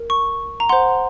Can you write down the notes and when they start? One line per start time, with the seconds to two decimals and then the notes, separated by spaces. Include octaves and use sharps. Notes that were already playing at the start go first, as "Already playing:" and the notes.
Already playing: A#4
0.10 C#6
0.60 A#5
0.69 C5 F#5 C6